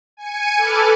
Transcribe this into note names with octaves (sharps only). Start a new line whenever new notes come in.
G#5 C#7 D#7
A4 B4 D6 F6